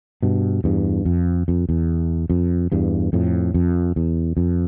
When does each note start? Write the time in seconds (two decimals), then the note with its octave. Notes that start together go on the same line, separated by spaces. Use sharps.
0.23 G2 B2
0.64 E2 G2
1.05 F2
1.48 F2
1.69 E2
2.30 F2
2.72 E2 G2
3.13 F2 A2
3.54 F2
3.96 E2
4.37 F2